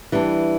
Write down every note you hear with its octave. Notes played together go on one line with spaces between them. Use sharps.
E3 G3 D4